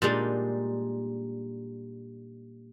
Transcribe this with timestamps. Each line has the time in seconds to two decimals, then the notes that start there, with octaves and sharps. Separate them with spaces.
0.02 A#2 G3 G#3 D4 D#4